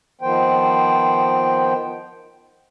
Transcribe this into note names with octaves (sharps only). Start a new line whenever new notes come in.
D#3 F3 B3 C5 G5